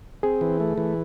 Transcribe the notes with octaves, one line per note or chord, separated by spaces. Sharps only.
C4 G#4
E3
A3
E3